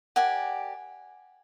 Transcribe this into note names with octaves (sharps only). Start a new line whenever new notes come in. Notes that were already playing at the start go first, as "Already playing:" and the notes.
G4 A#4 D5 F#5 G#5